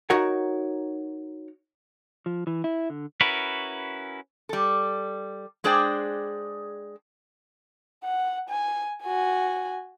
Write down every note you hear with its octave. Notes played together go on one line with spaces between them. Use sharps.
D#4 F#4 A#4 C#5 F#5
F3
E3
E4
D3
C#4 E4 F#4 A#4 B4
G3 A4
G#3 D4 G#4 C5 D5 G5
F#5
G#5
F#4 G#5